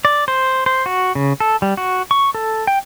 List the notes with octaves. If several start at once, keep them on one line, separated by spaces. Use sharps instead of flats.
D5
C5
C5
F#4
C#3
A4
G3
F#4
C#6
A4
G5